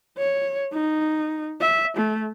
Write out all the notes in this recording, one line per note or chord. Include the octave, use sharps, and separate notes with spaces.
C#5
D#4
E5
A3